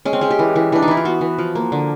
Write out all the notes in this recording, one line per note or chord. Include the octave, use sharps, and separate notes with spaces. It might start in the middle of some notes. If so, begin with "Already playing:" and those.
G#3 C#4
C4
G#3 C#4
G4
E3
E3
E3 D4
D#4
E3 E4
F4
B3 F#4
E3
F3
A#3
D3